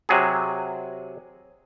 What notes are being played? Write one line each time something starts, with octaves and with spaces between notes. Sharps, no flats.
C3 F#3 G#4